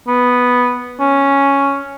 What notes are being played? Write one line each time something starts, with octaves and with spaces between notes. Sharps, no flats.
B3
C#4